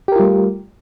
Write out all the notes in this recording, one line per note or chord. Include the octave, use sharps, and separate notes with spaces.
G3 A3 F4 G4 A#4